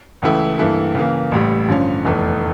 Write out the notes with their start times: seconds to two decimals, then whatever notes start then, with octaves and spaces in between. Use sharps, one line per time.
0.22 C#2 C#3 E3 A3 E4
0.58 G2 E3 A#3 E4 A4
0.95 C#3 E3 A#3
1.32 A1 A2 G3
1.68 G2 D3 F3 C#4
2.05 F1 E2 E3 A3